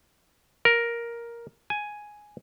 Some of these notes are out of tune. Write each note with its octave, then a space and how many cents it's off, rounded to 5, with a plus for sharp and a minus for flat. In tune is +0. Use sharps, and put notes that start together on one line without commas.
A#4 +5
G#5 +5